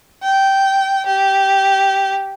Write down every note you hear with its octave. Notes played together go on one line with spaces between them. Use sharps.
G5
G4